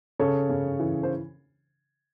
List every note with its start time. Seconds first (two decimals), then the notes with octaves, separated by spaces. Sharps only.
0.19 C#3 A4 C#5
0.49 C#3
0.79 E3
1.03 C5